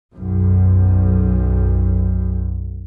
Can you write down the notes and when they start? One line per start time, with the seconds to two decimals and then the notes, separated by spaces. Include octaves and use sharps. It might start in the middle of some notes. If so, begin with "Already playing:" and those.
0.14 B1 F#2